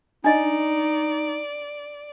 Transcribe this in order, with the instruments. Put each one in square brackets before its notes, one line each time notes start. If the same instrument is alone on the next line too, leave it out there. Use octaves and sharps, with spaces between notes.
[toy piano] D4 D#5 [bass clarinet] D#4 [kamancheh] D5